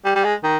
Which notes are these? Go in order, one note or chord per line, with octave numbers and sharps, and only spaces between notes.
G3
G3
G#3
D#3